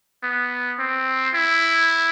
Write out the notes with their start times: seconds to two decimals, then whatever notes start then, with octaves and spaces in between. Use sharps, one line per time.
0.23 B3
0.79 C4
1.35 E4